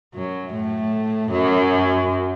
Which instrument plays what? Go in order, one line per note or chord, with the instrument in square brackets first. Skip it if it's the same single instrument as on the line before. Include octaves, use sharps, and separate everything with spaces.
[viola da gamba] F#2 F#3
A2 A3
F#2 F#3